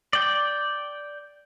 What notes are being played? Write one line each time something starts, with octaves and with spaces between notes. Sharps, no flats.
D5 G5